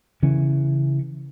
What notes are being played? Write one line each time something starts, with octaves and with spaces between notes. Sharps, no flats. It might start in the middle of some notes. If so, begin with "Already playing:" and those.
C#3 E3 C#4